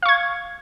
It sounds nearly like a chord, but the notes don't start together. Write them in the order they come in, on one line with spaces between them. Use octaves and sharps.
F5 C#6 G#6